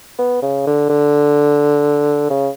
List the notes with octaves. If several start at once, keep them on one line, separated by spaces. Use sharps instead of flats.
B3
C#3
D3
D3
C#3